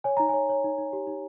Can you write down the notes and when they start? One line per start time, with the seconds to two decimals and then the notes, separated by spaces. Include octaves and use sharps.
0.04 C#5 G#5
0.17 D#4 A#5
0.29 C#5 G#5
0.49 C#5
0.64 D#4
0.78 D#4
0.93 G4
1.07 D#4